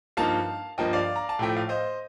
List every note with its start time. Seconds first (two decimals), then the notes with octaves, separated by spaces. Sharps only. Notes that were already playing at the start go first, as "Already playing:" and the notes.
0.17 G2 F3 A#3 D#4 F5 A5
0.78 G2 F3 A#3 D#5 G5
0.93 D5 F5
1.16 A#5
1.29 A5
1.39 A2 F3 A3 G5
1.56 F5
1.69 C5 D#5